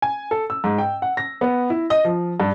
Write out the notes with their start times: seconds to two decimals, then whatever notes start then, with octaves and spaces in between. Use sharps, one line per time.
0.02 G#5
0.31 A4
0.50 E6
0.64 G#2
0.78 G5
1.02 F#5
1.17 A#6
1.41 B3
1.70 E4
1.90 D#5
2.05 F3
2.40 G2